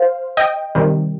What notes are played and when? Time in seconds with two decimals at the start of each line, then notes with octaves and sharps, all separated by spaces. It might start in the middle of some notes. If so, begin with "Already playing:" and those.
Already playing: C5 F5
0.37 D#5 G5
0.75 C3 D#3 G3